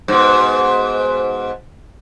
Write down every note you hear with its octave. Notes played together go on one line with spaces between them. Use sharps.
G#2 B2